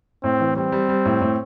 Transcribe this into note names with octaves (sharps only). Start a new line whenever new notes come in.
A2 C4
E3
G3 C4
G3
G3
A2
A2